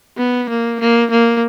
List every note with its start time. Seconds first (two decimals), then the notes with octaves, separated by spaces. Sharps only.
0.17 B3
0.49 A#3
0.80 A#3
1.11 A#3